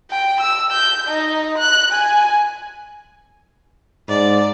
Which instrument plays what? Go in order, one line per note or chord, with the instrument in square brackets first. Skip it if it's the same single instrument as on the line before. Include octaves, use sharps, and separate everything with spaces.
[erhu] G5
E6
G6
D#4
F#6
G#5
[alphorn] G#2 [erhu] D5